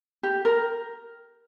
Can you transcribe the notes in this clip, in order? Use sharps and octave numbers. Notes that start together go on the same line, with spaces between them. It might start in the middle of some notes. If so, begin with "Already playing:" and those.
G4
A#4